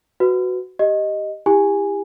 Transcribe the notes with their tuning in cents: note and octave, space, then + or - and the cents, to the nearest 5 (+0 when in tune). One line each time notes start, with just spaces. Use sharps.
F#4 +0 B4 +15
G4 +0 D#5 +0
E4 +0 G4 +30 G#5 -5